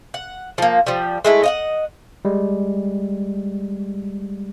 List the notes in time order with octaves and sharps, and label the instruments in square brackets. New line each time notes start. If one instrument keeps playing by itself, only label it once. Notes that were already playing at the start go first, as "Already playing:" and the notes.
[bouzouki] F#5
F3 A#3
F3 G3
G#3 A3 E4
D#5 F5 F#5
[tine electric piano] G3 G#3